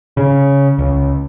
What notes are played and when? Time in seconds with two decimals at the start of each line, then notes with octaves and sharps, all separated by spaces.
0.17 C#3
0.78 C#2